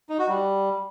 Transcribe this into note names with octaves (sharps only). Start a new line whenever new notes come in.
D#4
F#4
G3